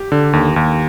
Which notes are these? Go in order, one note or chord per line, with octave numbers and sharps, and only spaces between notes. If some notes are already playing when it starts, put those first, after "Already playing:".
Already playing: G4
D3
D#2
D#2